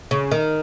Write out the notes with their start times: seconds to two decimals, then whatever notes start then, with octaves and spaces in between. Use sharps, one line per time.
0.11 C#3
0.31 D#3